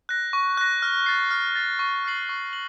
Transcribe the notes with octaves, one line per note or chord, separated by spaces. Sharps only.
F#6 A#6
C#6
F#6 A#6
F6
A6 C7
F6
A6 C7
C#6
F6 A6 C7 F#7
C#6
F#7